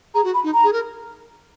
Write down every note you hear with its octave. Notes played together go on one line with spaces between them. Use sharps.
G#4 A#5
F#4
B5
D#4
A#5
G#4
A#4